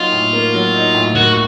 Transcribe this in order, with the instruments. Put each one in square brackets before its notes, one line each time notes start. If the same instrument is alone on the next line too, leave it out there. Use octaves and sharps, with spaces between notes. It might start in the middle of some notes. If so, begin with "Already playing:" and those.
Already playing: [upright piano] F#3 A#3 D#4 [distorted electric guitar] F4
[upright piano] A2
A#3
F#3
D#4
A2
[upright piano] A#3 [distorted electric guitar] F#4